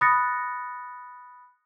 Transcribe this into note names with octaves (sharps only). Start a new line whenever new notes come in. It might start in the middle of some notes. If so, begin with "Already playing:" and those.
B5 D#6 F#6 A6 A#6 C#7